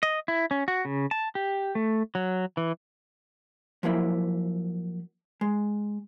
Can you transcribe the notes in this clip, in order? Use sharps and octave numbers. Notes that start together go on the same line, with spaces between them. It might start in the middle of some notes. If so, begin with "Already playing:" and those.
D#5
E4
C#4
F#4
C#3
A5
G4
A3
F#3
E3
F3 F#3 A#3 E4
G#3